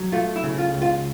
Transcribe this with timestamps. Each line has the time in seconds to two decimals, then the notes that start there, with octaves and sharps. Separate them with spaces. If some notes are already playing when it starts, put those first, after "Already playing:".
Already playing: F#3
0.12 A3 F4
0.36 E4
0.43 C#3
0.58 F4
0.74 C#2
0.82 F4